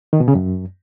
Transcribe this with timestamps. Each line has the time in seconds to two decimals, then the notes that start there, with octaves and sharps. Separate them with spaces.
0.13 D#3
0.20 B2
0.28 C#3
0.35 F#2